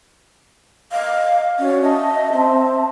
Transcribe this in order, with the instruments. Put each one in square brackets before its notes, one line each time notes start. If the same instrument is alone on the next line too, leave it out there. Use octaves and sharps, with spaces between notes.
[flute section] D#5 [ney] F5
[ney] C#4 [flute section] F#4 D5
[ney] D#5 [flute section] E5 A5
[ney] C4